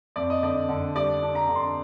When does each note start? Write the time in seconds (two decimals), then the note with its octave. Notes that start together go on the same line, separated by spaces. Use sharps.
0.16 F2 D5
0.30 D#5
0.43 D3 D5
0.69 D3
0.95 G3 D5
1.23 D4
1.35 A#5
1.48 D3
1.56 C6